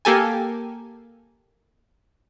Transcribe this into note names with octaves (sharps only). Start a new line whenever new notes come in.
A#3 G4 A4 G#5